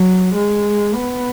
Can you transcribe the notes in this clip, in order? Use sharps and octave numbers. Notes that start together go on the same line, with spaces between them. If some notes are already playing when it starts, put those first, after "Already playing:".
Already playing: F#3
G#3
B3